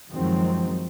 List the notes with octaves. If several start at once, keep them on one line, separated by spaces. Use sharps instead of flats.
F#2 D#3 F3 F#3 G#3 C4